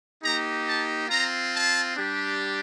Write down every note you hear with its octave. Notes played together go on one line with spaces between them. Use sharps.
A#3 D#4 G4 A#5
A5
C4 F4 A#5
A5
G3 D4 G4